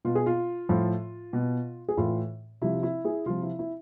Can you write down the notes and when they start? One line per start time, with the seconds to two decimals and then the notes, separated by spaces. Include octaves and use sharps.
0.05 B2 F4
0.15 G#4
0.26 F4
0.69 A2 F3
1.33 B2
1.89 G#4
1.97 A2 E3 F4
2.61 C3 F3 E4
2.83 E4
3.04 E4 G#4
3.26 C3 F3 F4
3.43 E4
3.59 E4